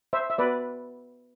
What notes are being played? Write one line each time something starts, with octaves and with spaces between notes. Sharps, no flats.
C5 E5
E5
B3 F#4 B4 D5